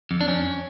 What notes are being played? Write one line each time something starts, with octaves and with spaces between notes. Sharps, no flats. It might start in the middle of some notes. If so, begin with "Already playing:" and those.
F2
D4
F2 C#4